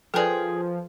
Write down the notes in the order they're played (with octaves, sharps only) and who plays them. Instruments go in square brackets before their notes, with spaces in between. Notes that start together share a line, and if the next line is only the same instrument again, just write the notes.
[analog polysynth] F3 [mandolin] G#4 G5 [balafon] A4 B4 D5